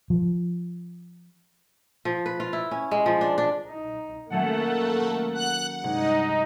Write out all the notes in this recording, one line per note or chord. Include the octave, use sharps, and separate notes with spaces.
F3
F3
B4
F4
E4
C#4
G#3
F3
D4
D4
D#4
D#3 F#3 A3 A#3 C#4 A4 F#5
F#5 F#6
G2 C3 G#3 D#4